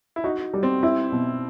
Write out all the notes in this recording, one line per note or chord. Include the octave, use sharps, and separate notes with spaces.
E4
D#4 F#4
G3
C4
E4
B2